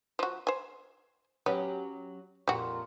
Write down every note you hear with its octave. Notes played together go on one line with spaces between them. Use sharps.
F3 F#4
C5 G#5
F#3 B3 C#4 G4
F2 A#2 G3 F#4